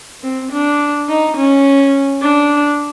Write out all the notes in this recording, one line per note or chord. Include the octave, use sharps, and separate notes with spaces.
C4
D4
D#4
C#4
D4